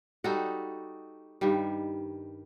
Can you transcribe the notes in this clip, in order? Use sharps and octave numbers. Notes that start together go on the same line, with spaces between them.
G3 D#4 F#4 A4
G2 D#3 G3